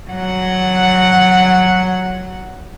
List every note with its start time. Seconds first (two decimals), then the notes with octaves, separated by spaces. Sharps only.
0.10 F#3 F#5